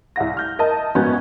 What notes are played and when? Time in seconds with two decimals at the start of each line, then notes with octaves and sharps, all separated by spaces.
0.16 C2 E5 F#5 A#6
0.37 F6 G6 A#6
0.59 A#4 D#5 E5 A5
0.95 A#1 G#2 B2 B3 C#4 G6